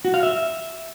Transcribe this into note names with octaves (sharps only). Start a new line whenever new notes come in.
F#4
F5
E5